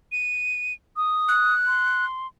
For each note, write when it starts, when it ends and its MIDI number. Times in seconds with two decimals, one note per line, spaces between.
0.12 0.73 99
0.96 1.54 87
1.29 2.05 90
1.67 2.27 84